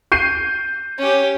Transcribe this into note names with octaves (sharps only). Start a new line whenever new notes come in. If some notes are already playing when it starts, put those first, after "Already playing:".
G6 C7 D#7
C#4 G4